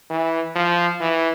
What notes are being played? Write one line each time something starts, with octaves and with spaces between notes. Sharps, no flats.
E3
F3
E3